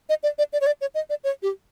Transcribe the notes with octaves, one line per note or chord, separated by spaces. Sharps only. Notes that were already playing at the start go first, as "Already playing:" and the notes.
D#5
D5
D5
D5
C#5
D5
C#5
D#5
D5
C#5
G4